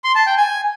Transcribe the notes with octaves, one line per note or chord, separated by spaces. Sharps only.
C6
A5
G5
G#5